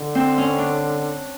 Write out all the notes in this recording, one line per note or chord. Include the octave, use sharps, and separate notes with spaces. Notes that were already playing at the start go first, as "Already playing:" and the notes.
Already playing: D3
C4
C#4
D4